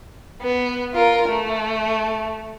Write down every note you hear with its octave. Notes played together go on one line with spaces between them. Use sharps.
B3
F4 A#4
A3